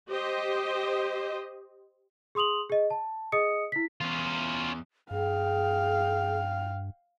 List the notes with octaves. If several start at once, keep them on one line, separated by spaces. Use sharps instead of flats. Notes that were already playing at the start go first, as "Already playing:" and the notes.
G4 C5 D#5
G#4 C6 D#6 F7 F#7
G#4 D#5
A5
G#4 D#5 D#6 C#7
E4 B6
E2 C#4 F4
G2 G#4 F5 G5